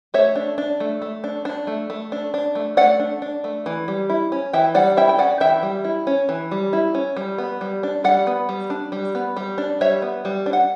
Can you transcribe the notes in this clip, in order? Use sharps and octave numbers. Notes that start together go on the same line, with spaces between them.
A3 C#5 E5
D4
D4
A3
A3
D4
D4
A3
A3
D4
D4
A3
A3 D5 F#5
D4
D4
A3
E3
G3
E4
C#4
E3 E5 G5
G3 D5 F#5
E4 E5 G5
G5
C#4 D5 F#5
E3 E5 G5
G3
E4
C#4
E3
G3
E4
C#4
G3
B3
G3
D4
G3 D5 F#5
B3
G3
D4
G3
B3
G3
D4
G3 C#5 E5
B3
G3
D4
F#5